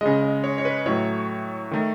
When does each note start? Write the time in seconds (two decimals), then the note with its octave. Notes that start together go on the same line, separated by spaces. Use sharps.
0.01 C#3 G#3 D#5
0.23 D#5
0.44 C#5
0.58 C#5
0.65 B4
0.86 A2 F#3 A3 C#5
1.71 D#3 A3